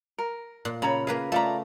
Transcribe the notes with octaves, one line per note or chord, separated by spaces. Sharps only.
A#4
A#2
C#3 C#5 A#5 B5
A#3 G#4 A#4 B4 F5
A3 F4 D5 A#5 B5